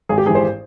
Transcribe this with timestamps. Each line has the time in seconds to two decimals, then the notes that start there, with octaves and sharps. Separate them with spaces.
0.09 G#1 G#4
0.18 G4
0.26 G#2 G#4
0.29 E3
0.35 C5